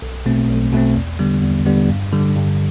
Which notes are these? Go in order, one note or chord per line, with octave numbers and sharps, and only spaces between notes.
B1
B2 A3 C4
B1
B2 A3 C4
E2
D3 G3 B3
E2
D3 G3 B3
G2
D3 G3
G2